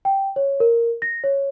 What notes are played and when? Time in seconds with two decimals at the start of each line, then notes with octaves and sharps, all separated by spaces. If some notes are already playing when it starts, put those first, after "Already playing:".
0.05 G5
0.36 C#5
0.60 A#4
1.02 A#6
1.24 C#5